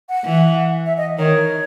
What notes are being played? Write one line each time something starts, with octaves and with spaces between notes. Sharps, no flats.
F#5
E3
E5
D#5
D#3 C#5